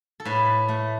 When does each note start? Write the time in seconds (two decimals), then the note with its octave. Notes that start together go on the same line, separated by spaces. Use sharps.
0.20 A4
0.25 A2 B4
0.68 A3